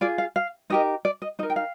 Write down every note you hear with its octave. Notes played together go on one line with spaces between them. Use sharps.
F4 G#4 D5
F5
F5
D#4 G4 A#4 D#5
D5
D#5
D#4 A#4 D#5
G5
F5